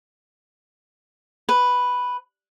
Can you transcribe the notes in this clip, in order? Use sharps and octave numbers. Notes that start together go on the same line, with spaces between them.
B4